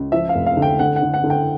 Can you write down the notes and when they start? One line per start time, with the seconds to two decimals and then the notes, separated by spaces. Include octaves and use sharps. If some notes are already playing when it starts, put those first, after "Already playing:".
Already playing: C#2
0.12 F3 E5
0.29 F5
0.34 F1
0.46 F5
0.57 D3
0.62 G5
0.79 D3 F#5
0.96 F#5
1.02 D3
1.14 F#5
1.24 D3
1.30 G5